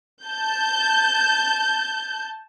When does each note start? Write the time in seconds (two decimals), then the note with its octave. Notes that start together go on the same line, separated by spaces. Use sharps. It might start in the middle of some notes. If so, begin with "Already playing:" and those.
0.24 A5 G6